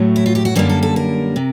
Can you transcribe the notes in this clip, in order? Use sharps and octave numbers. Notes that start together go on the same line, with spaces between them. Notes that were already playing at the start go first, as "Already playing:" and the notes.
Already playing: A2 F#3 A3
E4
F4
G4
F#4
F#2 D3 G3 A#3 G4
A4
A4
A#4
C3